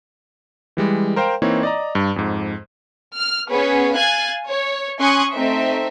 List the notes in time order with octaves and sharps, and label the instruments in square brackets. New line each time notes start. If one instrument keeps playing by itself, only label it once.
[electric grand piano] E3 G3 G#3
A#4 C5 F5 G5
E3 A#3 C4 D#4 E4 C#5
D5 D#5 A#5
G2
F2 G#2
[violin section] F6
B3 C#4 G#4 B4 C#5
F5 G#5 F#6 G#6 A6
C#5
C#4 G#5 C6 C#6 D#6 F#6
A3 C4 D#4 E5